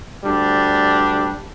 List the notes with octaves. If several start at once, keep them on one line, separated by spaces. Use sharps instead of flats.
D2 G3 D4